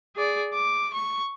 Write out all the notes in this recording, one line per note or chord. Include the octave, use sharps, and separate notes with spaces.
G#4 D5
D6
C#6